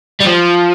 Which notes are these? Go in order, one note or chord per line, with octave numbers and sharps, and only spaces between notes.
G3
F3